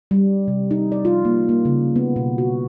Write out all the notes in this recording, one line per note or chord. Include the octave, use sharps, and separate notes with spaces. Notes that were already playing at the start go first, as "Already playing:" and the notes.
G3
C3
D#4
D5
F4
A#3
A#3
C#3
B3
B2
F#4